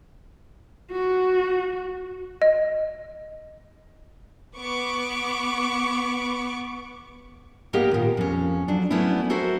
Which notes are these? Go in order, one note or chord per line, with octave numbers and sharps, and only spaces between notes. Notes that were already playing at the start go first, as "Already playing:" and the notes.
F#4
D#5
B3 C#6 D6
A#3 B3 G4 A#4 D#5 F5
D#2 A#2
F2 C#4
F2 F#3 D4
F#3 A3 B3 C#4 D4 E4
F#4 A4 A#4 C5 E5